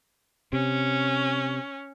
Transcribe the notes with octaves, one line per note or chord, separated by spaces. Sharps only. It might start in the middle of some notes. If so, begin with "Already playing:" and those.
C3 C#4